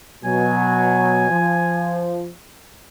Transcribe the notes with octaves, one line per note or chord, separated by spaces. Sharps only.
B2 F#3 G#5
F3